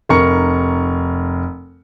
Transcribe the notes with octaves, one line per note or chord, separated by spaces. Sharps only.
F1 A#4 C#6 C#7